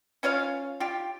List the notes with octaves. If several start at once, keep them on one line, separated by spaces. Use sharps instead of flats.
C#4 F4 C#5 F5
F4 G4